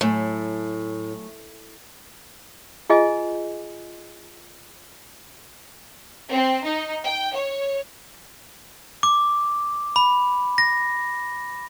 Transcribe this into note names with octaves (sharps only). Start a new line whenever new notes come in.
A2 F#3 A3 G#5
F4 G#4 D#5 G#5
C4
D#4
G5
C#5
D6
B5
A#6